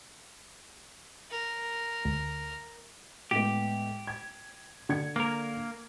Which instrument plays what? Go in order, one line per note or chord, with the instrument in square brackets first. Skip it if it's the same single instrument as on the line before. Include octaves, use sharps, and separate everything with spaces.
[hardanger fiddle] A#4
[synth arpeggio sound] D2
[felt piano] A2 G#3 B3 [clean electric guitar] G4
[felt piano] G#6
D3 G#6 C#7
[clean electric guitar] A#3 A#4